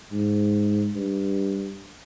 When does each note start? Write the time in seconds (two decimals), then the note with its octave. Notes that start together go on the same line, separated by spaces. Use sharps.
0.12 G#2
0.95 G2